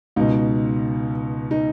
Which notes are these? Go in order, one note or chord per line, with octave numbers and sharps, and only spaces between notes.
C#2 B2 D#4
D#4